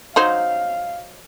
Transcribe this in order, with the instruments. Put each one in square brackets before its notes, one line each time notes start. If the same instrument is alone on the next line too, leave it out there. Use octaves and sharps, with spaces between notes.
[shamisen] F#3 D#4 C5 [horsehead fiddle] F5